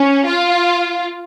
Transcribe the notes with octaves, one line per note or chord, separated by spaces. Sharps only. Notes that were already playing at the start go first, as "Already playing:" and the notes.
Already playing: C#4
F4